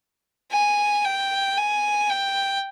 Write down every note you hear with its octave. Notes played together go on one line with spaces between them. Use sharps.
G#5
G5
G#5
G5